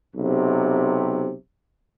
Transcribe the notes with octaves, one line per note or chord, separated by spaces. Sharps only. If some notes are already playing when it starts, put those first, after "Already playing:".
B1 C3